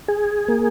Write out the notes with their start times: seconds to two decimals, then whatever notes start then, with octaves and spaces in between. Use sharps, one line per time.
0.08 G#4
0.48 A#3